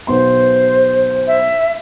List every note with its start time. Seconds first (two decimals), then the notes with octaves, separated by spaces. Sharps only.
0.07 B1 B3 C5 C6
1.27 E5